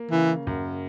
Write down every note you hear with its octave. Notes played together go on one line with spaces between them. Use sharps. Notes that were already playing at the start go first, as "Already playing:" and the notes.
Already playing: A#3
C#3 E3
F#2